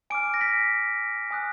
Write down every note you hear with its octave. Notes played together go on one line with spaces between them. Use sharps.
G#5 D6 F6 D7
A#6
B6
G#5 D#6 F#6